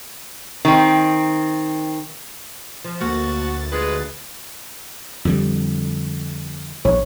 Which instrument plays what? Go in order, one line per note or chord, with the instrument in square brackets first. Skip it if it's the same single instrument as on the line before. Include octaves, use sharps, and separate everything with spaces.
[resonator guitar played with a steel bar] D#3 C4
[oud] F3
[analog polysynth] D2 A6 [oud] A#3 [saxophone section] F#4
[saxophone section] G#3 B4 [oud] F4
[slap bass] F2 D3 G3
[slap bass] A#1 [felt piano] C#5